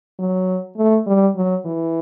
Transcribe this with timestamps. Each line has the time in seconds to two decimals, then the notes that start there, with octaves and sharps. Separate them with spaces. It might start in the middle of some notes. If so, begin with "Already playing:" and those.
0.19 F#3
0.78 A3
1.07 G3
1.36 F#3
1.65 E3